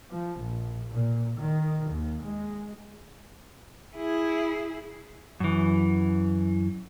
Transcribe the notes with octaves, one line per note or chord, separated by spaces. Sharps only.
F3
A#1
A#2
D#3
D#2
G#3
E4 G#4
F#2 E3